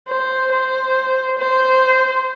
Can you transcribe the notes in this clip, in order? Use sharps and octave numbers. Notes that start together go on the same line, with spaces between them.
C5
C5
C5